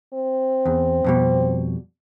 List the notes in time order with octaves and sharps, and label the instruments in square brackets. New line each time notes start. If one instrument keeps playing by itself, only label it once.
[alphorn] C4
[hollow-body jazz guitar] E2
F2 B2 G3